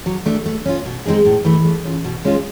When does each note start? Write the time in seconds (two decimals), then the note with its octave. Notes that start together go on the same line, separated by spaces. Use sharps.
0.06 F#3
0.26 A3 D4
0.46 A3
0.65 C#4 F4
0.86 B2
1.05 G#3 C4 D#4 G#4
1.25 A2
1.45 E3 A3
1.65 A3
1.85 C#4 F4
2.05 B2
2.25 G#3 C#4 F4